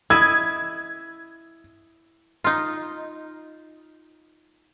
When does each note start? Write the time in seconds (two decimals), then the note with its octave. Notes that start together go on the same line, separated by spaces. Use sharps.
0.10 E4 D#5 E5 G#6
2.44 D#4 F4